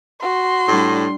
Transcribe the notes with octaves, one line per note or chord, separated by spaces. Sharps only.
F#4 C6
A2 G3 D4